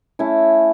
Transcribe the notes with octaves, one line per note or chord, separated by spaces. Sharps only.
A3 C#4 E4